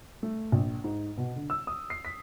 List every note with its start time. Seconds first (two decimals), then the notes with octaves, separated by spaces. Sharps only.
0.23 A3
0.52 A#1
0.84 G#2
1.17 B2
1.36 D3
1.50 E6
1.67 D#6
1.90 C7
2.05 B6